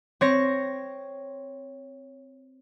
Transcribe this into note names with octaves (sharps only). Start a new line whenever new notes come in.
C4 C#5 A#6